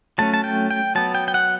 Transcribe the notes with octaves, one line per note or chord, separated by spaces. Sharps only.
F#3 A3 C#4 A5
A5
G5
G5
F#3 B3 A5
G5
G5
F#5